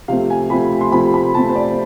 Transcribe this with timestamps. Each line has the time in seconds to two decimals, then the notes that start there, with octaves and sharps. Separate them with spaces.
0.08 C3 F3 A3 C4 F5
0.30 G#5
0.50 C3 F3 A3 C4 B5
0.81 C6
0.92 C3 F3 A3 C4 B5
1.14 B5
1.34 C3 F3 A3 C4 A5
1.49 C5
1.55 D5